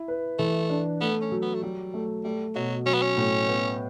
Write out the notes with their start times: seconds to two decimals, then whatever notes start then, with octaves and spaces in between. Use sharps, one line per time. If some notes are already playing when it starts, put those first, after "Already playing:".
Already playing: E4
0.08 B4
0.39 E3 A3
0.70 D4
1.01 A3 B3
1.22 C#4
1.32 F#3
1.42 B3
1.55 A3
1.63 F#3 G3
1.94 A3
2.24 G3 A3
2.55 B2 F#3
2.86 F#3 C#4
2.94 B3
3.02 C#4
3.17 A2
3.48 B3